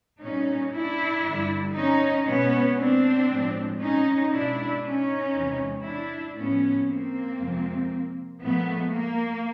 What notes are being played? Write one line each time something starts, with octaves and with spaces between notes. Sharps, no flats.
A#2 G3 C#4 D#4
D4 E4
G2 D3 G3
C#4 D#4
B2 G#3 B3 C#4
C4 D4
A2 F3 G#3
C#4 D#4
B2 G#3 D4 E4
C#4 D#4
E2 C3 E3 G#3
D4 E4
A2 F3 A3 B3 C#4
A#3 C4
F2 C3 F3 G#3
A#2 F3 G#3 A3 B3
A#3